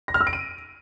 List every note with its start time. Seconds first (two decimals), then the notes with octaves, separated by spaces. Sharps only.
0.08 A#6
0.14 F6
0.21 E6
0.27 D7
0.33 D#7